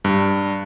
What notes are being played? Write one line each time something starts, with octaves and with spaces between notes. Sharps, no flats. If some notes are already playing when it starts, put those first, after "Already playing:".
G2